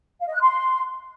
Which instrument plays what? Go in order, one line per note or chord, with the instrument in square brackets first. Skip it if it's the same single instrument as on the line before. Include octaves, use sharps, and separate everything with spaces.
[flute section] F5
D#5
F#6
C6